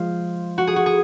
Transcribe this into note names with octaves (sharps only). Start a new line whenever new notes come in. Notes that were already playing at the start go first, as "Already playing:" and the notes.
Already playing: F3 G#3 F4
F#4
G#4
F#4
G#4